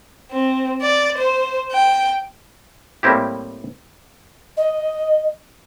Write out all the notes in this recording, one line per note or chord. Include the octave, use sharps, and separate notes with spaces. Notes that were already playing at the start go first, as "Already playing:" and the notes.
C4
D5
C5
G5
A2 G3 A#3 C4 E4 G4
D#5